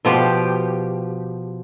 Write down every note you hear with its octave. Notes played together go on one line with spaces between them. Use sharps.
B2 F3 G4